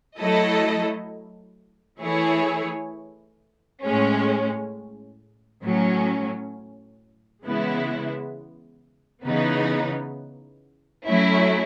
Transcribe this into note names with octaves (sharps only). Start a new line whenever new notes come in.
F#3 A3 E4 A4 D#5
E3 A3 E4 G#4 C#5
A2 G#3 C#4
A2 F#3 C#4
C#3 E3 G#3 B3 E4
C#3 E3 B3 D#4
F#3 A3 C#4 E4